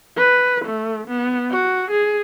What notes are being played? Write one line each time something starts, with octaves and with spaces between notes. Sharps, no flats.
B4
A3
B3
F#4
G#4